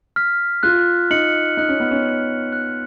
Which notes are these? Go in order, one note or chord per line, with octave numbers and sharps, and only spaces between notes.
F6 B6
F4 F#6
D#4 C#7 F#7
D#4 F#6
C#4
B3
C#4
C#7 F#7
F#6